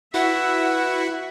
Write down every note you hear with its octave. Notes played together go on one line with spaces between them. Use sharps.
E4 F#4 B4 E5 F#5